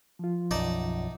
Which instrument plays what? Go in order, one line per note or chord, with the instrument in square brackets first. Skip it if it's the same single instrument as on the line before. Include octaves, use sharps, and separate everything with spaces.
[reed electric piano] F3 F4
[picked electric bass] B1 F#2 [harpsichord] D#4 D5 A5